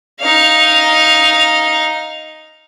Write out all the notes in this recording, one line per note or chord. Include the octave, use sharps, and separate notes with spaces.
D#4 F5